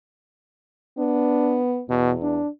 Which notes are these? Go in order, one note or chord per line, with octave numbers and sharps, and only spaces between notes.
B3 D4
E2 B2
D4